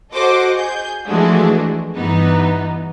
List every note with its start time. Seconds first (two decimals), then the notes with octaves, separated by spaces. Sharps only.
0.13 F#4 A4 C5 D#5 F#5 D6
0.54 G#4 G6
1.06 E3 F3 G#3 A3 D4 F#4
1.95 G2 E3 B3 D#4